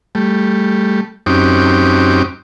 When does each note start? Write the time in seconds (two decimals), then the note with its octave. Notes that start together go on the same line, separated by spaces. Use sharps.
0.15 G3 A3
1.26 F#2 C4 C#4 D#4 G4 D6